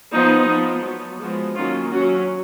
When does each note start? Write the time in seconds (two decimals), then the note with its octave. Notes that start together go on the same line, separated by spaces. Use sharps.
0.12 F3 B3 D#4
0.47 F3 B3
0.84 F#3 B3
1.19 F3 G#3 B3 F#4
1.55 D#3 F#3 A#3 C#4 F4
1.92 F#3 C#4 F#4